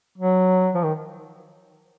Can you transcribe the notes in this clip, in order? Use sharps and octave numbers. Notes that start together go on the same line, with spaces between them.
F#3
F3
D#3